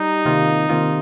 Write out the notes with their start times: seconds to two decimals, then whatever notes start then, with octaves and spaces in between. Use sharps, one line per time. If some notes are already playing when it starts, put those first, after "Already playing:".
Already playing: G3 D#4
0.25 C3 D#3 A#3 F4
0.69 C3 D#3 A#3 F4